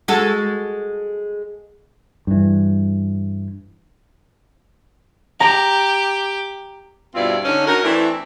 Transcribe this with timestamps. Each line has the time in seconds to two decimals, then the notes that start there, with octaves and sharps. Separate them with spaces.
0.08 G#3 F#4 A4
2.27 G2 E3
5.40 G4 A#5
7.15 G2 B2 C4 E4 F4 D5
7.45 D3 C#4 D#4
7.66 C#4 D#4 F#4 A#4
7.84 E3 A3 C4 D4 E4